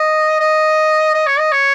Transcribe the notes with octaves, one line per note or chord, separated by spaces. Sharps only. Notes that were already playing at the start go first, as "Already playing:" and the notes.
Already playing: D#5
D#5
D#5
C#5
D#5
C#5